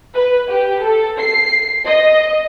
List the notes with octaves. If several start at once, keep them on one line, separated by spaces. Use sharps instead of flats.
B4
G4
A4
C7
D#5